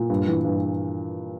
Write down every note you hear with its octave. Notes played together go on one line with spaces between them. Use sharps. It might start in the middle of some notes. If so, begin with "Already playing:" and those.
Already playing: A#2
G2
E3
G2